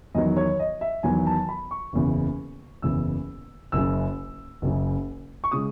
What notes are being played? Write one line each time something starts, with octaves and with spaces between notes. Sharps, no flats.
E2 D#3 F#3 D#5
C#5
D#5
E5
E2 D#3 F#3 G#5
A5
B5
C#6
F#1 E2 C#3
F#1 E2 C#3 E6
F#1 F#2 C#3 E6
F#1 F#2 C#3
C#6
C#3 G#3 D#6